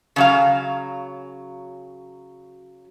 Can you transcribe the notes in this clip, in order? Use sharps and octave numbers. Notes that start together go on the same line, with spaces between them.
C#3 F#3 F5